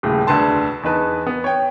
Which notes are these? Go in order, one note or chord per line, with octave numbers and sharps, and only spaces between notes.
D#1 A2 C#3
E1 D2 D3 B4 A5 C6
E2 D#4 B4 A5
B3
C#5 G5